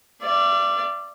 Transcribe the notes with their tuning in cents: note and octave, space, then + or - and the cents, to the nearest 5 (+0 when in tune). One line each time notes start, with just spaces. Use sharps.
D5 +0 F5 -45